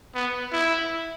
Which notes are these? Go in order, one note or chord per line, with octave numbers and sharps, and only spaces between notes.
B3
E4